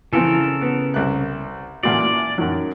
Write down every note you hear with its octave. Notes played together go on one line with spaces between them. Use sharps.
C#3 E3 F3 C4 A4 A#4
B3
C2 F#6
A1 A#2 F#4 D5
F#2 D#3 F#3